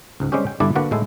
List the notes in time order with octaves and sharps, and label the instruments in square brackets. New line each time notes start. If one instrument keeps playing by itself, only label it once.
[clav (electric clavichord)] C#2 G#2
G3 G#3 C4 C#4 G4
G5
G1 G3 D4 E4 A4 D5
D3 A#3 F#4 B4 D5 F#5
A2 G#3 E4 A4